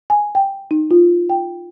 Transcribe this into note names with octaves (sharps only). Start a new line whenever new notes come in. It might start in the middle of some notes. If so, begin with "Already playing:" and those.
G#5
G5
D#4
F4
G5